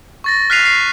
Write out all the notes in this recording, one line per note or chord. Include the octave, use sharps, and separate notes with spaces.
C#6 A6 A#6
F6 F#6 B6 C7 D#7 F7
C7